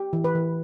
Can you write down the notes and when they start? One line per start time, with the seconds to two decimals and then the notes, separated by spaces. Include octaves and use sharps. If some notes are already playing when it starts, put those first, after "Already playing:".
Already playing: G4
0.13 E3
0.24 B4
0.35 E3